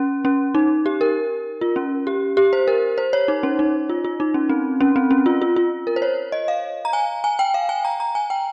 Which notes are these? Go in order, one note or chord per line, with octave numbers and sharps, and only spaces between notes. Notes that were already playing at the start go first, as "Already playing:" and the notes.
Already playing: C#4
C#4
D#4
G4
A#4
F4
C#4
G4
G4
C5
A#4
C5
C#5
D#4
C#4
D#4
F4
F4
D#4
C#4
C4
C#4
C4
C#4
F4
F4
F4
A#4
C5
C#5
D#5
F5
A#5
G#5
G#5
G5
F5
G#5
A#5
A#5
G#5
G5